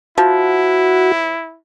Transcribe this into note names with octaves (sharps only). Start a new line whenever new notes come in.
F3 E4 F#4